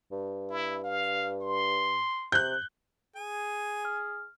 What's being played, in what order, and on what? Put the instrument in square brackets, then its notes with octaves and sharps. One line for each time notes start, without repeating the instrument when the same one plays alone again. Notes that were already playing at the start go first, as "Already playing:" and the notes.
[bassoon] G2
[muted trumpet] E4
F5
C6
[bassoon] C3 [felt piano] F#6 G6
[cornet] G#4 [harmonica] G#5
[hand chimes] F6